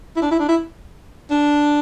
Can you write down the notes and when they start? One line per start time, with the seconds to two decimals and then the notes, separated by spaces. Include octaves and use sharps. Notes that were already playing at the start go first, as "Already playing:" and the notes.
0.16 E4
0.22 D4
0.31 E4
0.39 D4
0.48 E4
1.31 D4